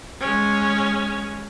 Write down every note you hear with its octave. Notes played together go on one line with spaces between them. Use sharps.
G#3 C#4